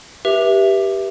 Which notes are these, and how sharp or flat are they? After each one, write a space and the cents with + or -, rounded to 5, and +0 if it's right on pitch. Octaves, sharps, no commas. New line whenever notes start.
G4 +0 B4 -35 E5 +0